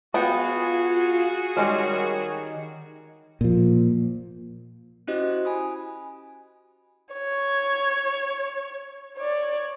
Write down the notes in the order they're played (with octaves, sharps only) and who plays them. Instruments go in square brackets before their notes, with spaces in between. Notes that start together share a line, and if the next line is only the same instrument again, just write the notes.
[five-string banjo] B3 G5 [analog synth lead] F4 [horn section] F#4 G#4
[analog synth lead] D#3 [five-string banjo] G3 G#3 C#4
[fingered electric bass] A#2 F3
[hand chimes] C#4 E4 F#4 G4 C5 D#5
G#5 B5 D#6
[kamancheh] C#5
C#5 D5